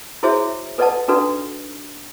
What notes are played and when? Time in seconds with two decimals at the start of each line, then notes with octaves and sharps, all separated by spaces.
0.23 E4 F#4 G#4 C5 C#5 E5
0.78 A4 B4 D5 D#5 F#5 A5
1.08 D4 D#4 F#4 A4 B4 D5